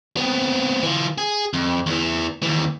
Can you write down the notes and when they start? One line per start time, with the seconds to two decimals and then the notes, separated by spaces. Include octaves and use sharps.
0.17 B3 C4
0.83 E3 F4
1.18 G#4
1.53 F2
1.86 E2 E3
2.43 D#2 E3